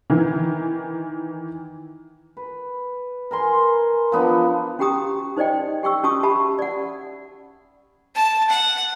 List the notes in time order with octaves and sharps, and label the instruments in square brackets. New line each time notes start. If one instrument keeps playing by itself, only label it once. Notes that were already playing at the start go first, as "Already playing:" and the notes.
[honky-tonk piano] D#3 E3
[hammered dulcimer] B4
A#4 G#5 C6
F3 B3 D4
[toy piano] C#4 F#4 G4 G5 A#5 D#6
D#4 C5 D5 D#5 G5
G4 G5 C#6 E6
C#4 F#4 A5 C#6 D#6 E6
G4 E5 A5 B5
D5 F#5
[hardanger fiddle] A5
F#5